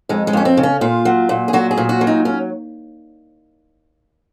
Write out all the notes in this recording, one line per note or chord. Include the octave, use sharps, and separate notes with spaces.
F2 G#3
G#3
F2 C#4
C4
C#3
C#4
A#2 F4
F#3
A#2
G#4
F#3 F#4
G#4
A#2
F#4
F#3
D#4
C#4